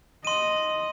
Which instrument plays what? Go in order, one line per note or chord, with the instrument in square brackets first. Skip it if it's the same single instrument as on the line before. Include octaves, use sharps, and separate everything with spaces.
[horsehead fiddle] D#5 [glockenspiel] C6 D#7